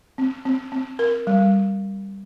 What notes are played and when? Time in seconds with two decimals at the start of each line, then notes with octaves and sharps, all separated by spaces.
0.18 C4
0.45 C4
0.72 C4
0.99 A#4
1.27 G3